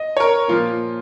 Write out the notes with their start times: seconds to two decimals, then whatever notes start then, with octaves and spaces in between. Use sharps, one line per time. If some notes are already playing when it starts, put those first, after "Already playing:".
Already playing: D#5
0.17 C#5
0.20 A#4
0.48 A#2 F3 A#3 F4